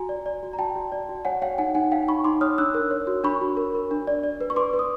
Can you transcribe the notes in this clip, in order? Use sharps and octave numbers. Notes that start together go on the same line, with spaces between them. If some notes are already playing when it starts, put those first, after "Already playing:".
Already playing: F#4 G#5 A#5
D5
D5
F#4
A#5
F#4 G5 A5
F#4
D5
F#4
C#5 F#5 G#5
C#5 F5 G5
D#4 F#5 G#5
D#4 F#5 G#5
D#4 F5 G5
D#4 B5 C#6
D#4 C6 D6
C#5 D#6 F6
D4 E6 F#6
A#4
C#5
F#4
D4 B5 C#6
F#4
A#4
A#4
D4
D5
D5
B4
C#6
B4 C6 D6
B4
D#6